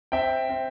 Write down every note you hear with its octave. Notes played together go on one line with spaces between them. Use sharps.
C4 E5 G5
C4